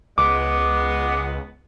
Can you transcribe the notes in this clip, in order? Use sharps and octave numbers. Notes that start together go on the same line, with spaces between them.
C#2 G#3 B3 D6